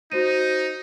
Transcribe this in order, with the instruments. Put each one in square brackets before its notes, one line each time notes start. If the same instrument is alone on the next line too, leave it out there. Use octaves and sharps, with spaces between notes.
[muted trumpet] D#4 [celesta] F#4 C5 D#7